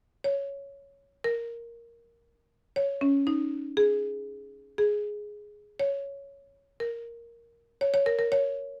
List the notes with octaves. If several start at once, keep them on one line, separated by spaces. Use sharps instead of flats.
C#5
A#4
C#5
C#4
D#4
G#4
G#4
C#5
A#4
C#5
C#5
A#4
A#4
C#5